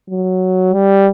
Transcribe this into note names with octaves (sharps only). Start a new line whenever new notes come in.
F#3
G3